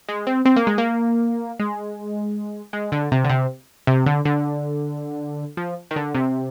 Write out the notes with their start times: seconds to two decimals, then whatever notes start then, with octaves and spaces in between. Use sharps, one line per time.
0.08 G#3
0.27 C4
0.45 C4
0.56 A#3
0.67 G#3
0.78 A#3
1.59 G#3
2.73 G#3
2.92 D3
3.12 C3
3.24 D3
3.29 C3
3.87 C3
4.06 D3
4.25 D3
5.57 F3
5.91 D#3
5.96 D3
6.15 C3